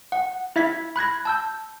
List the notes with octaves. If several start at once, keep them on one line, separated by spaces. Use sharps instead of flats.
F#5
E4 E5 G#6 B6
B5 F#6 G#6 A#6
A5 E6 G6